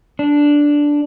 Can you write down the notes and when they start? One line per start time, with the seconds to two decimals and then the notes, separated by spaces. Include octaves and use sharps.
0.19 D4